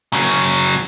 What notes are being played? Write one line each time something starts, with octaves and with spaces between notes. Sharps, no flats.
C#3 F#3